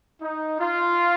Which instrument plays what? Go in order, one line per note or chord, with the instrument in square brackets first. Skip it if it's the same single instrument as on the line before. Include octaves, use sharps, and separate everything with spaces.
[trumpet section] D#4
F4